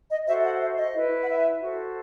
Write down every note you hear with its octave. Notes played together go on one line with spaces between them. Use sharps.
D#5
F#4 A4 C5 E5
F#5
E5
D#5
E4 B4
F#5
E5
F#4 A4 C5